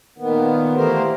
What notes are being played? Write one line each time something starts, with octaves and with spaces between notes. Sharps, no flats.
A#2 D#3 B3
E3 A3 A#3 G4 A#4 C5